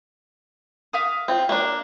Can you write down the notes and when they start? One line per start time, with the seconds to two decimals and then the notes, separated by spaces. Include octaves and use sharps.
0.93 E5 F5 D#6
1.28 C4 F4
1.49 A#3 D4